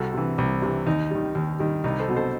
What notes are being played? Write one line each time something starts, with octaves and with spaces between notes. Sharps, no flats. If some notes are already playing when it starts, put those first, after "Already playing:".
Already playing: C2 F#4 A4
C3 E3
C2
C3 E3
D#2 D#4
D#3 G3
D#2
D#3 G3
C2 D#4
A4 C5
B2 F#3
A4 C5